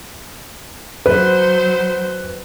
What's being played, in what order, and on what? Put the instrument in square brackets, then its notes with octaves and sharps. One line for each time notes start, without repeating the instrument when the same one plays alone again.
[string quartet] F#3 C5 [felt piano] B4